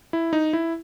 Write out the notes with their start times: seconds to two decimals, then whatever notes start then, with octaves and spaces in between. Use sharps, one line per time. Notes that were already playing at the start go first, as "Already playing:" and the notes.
0.13 E4
0.33 D#4
0.53 E4